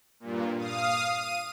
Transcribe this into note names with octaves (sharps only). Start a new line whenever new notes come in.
G2 A#2
F5 D#6
D#7